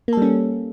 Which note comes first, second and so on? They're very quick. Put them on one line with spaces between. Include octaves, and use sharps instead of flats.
A#3 A4 G3 C#4